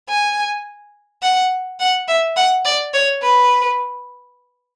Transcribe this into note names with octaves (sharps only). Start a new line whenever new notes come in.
G#5
F#5
F#5
E5
F#5
D5
C#5
B4